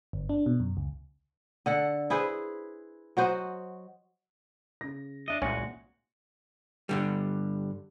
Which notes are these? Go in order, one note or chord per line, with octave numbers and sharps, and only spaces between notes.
G1
D4
B2
F#2
C#2
D3 A4 F#5
E4 G#4 B4 C5
F#3 F#4 C5 D#5
C#3 A#6
D4 D#5 E5
C2 A#2 G#3 C#4 F#4
G2 D3 G3